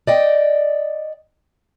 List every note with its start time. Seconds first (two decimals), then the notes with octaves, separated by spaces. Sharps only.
0.07 D5 D#5 G5